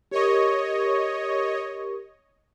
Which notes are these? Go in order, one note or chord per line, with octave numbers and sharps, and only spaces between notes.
G4 A#4 C#5 D#5 C#6